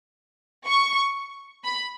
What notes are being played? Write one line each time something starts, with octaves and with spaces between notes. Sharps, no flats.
C#6
B5